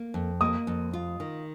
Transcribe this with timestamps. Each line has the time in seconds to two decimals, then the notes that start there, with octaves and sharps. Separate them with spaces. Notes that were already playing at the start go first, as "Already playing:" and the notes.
Already playing: A#3
0.14 F2
0.41 A#3 D#6
0.67 F2
0.93 F4
1.20 D#3